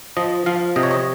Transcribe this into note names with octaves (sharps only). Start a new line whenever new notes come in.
F3 D#5
F3 F5
C3 D#5
C#5
D#5